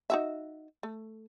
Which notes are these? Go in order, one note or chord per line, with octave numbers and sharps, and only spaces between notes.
D#4 F#4 E5
A3